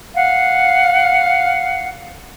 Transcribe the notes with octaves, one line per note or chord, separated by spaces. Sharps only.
F5 F#5